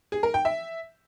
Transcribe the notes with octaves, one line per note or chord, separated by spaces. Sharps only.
G#4
A#4
G5
E5